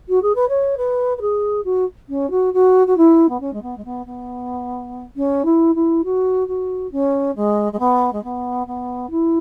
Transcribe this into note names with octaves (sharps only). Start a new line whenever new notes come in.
F#4
G#4
B4
C#5
B4
B4
G#4
F#4
C#4
F#4
F#4
F#4
E4
B3
C#4
G#3
B3
G#3
B3
B3
C#4
E4
E4
F#4
F#4
C#4
G#3
G#3
B3
G#3
B3
B3
E4